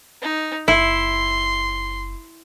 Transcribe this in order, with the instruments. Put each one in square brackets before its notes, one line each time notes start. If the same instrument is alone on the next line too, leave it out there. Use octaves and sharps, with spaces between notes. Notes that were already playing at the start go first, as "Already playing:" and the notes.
[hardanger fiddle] D#4
[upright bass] F#1 [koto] E4 [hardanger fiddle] C6